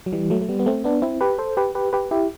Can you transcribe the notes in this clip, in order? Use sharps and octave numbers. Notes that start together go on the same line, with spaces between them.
F#3
E3 G3
F#3 A3
A3
G3 B3
B3
A3 C4
B3 D4
C4 E4
G4 B4
A4 C5
G4 B4
G4 B4
G4 B4
E4 G4